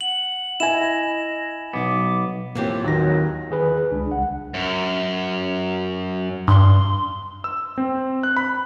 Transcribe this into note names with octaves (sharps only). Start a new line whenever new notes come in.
F#5 F#7
E4 D#5 G#5 E7
B1 B3 D6
A2 E3 F3 A#3 C4 G4
D#2 D#3 F#3 D#4 A#6
D#3 G#4 B4
C#2 D4
C2 F#5
F#2
G2 C6
E6
C4
F#6
B5